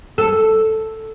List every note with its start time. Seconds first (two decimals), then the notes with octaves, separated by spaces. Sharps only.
0.18 A4